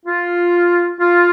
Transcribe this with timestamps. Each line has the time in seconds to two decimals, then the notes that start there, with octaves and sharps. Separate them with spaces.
0.06 F4
1.00 F4